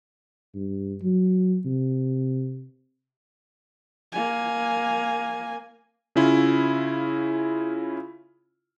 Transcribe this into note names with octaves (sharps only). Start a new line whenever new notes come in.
G2
F#3
C3
A#3 G#5
C#3 C#4 E4 F4